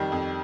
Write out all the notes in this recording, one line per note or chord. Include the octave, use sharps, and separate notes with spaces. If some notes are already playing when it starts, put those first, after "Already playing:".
Already playing: F2 D#3 G3
F2